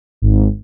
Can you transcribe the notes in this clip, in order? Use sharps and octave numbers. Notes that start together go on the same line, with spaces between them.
G#1